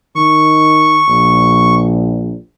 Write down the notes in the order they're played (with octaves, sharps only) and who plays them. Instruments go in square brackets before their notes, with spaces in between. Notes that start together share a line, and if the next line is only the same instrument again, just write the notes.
[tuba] D#3 [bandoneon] C#6
[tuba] A#1